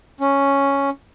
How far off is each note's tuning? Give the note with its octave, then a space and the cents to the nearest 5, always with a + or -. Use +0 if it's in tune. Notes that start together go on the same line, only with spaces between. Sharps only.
C#4 +0